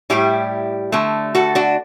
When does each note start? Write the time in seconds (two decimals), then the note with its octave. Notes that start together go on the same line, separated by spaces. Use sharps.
0.10 A2 G3 E4 G4
0.92 D3 A3
1.35 F#4 A4
1.55 D4 F#4